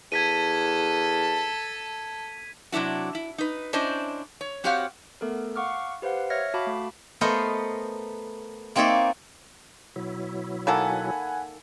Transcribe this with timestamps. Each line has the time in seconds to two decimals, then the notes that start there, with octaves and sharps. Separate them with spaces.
0.12 E2 A4 A5 G#6 B6 D#7
2.72 C3 F#3 D4 E4 F#4
3.15 E4
3.38 D#4 B4
3.73 C#4 D4 E4 C5 D#5
4.41 C#5
4.64 C4 F#4 G4 C#5 F5 F#5
5.21 A3 B3 A4 A#4
5.56 F5 F#5 C#6 D6 F6
6.02 G4 B4 C5 F5 F#5
6.30 C#5 E5 F6 G#6 A#6 C#7
6.54 F#4 F5 A5 B5 D6
6.67 A3
7.21 A3 B3 A#4 C5 D#5
8.76 A#3 C4 D#4 C#5 D5 E5
9.96 B2 F#3 E4
10.67 D#3 A#3 A4 F#5 G#5 B5